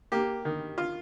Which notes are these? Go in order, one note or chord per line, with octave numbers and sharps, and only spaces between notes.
A#3 G4
D#3
F4